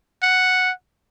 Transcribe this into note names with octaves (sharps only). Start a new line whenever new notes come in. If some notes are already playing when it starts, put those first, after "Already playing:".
F#5